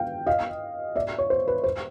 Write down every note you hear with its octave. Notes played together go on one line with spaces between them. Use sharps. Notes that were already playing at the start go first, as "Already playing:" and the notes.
Already playing: F5 G5
D#5 F5
D5 E5
C#5
C5
B4
C5